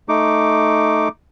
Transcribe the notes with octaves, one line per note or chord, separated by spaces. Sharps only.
A3 D#4 D6